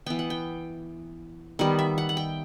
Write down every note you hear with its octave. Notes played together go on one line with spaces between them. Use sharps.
E3 B3 G5
F#5
G5
D#3 G3 B3 F#5
E5
F#5
F#5
G5